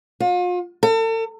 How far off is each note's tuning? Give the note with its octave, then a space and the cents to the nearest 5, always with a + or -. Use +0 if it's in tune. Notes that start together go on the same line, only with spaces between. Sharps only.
F4 +40
A4 +40